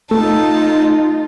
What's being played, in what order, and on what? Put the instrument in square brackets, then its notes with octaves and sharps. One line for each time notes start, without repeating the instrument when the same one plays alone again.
[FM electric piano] A3 [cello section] D#4 F4 [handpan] A4 [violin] A5